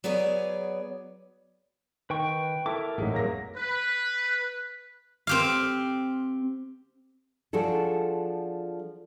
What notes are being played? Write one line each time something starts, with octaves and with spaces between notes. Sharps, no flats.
F#3 B3 G#4 C#5 D5
D#3 B4 G5 C#6
E4 A4 A#4 E5 D6
A1 G#2 F#3 G#3
G2 F#3 A#3 C#5 A#6
B4
C4 G4 F5
F3 D4 F#4 G#4 A4